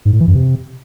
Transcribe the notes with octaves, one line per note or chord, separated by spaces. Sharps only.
G#2
A2
E3
F#2
C3